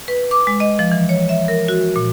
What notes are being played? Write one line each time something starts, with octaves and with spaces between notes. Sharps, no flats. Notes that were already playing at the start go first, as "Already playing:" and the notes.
B4
D6
G#3
D#5
F3
E3
C#5
E5
A#4
F#4
A#2